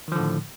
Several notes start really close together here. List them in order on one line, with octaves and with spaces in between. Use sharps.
D#3 F3 D3 A2